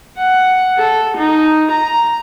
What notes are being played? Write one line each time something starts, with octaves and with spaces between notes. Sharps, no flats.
F#5
A4
D#4
A#5